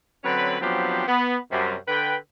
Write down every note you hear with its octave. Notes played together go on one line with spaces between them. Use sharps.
D3 F#3 C4 C#4 B4
F3 F#3 B3 C4 D4 G4
B3
F#2 C3 G3
D3 B4 G5